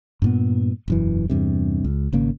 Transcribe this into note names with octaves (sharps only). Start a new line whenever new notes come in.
G2 A#2 B3
E1 F#2 E3
E2 G2 C3
C#2
G#1 C#3 A#3